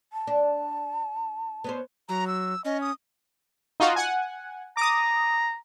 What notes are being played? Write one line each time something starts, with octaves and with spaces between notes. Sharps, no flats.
A5
D4
B3 C#4 C5
F#3 A#5
E6
C#4 D#5
D#6
D#4 F4 F#4
F#5 G#5
A#5 D6 D#6